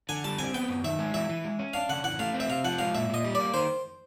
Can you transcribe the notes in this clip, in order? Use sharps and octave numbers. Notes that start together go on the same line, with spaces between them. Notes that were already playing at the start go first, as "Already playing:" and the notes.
D3 G#5
G3 A5
C4 G#5
B3 G5
F#2
D#3 E5
G#3
E3 E5
E3
G#3
C#4
D4 F5
C#3 F#5
E3 F#5
A3 F5
C4
E5
C3 F5
F3 F#5
G#3 F5
A#2 E5
A#2 D#5
G3
A#3 D5
D#3 C5